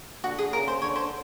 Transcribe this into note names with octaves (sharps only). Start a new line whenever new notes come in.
D3 F#4
G#4
C#3 A#4
C5
D3 C#5
C5